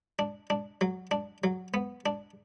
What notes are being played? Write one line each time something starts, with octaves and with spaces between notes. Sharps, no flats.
D4
D4
F#3
D4
F#3
B3
D4